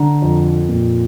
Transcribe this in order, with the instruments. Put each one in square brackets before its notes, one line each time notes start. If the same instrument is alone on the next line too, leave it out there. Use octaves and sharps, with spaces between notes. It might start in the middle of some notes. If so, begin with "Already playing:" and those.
Already playing: [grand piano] D3 A#5
F2
A#2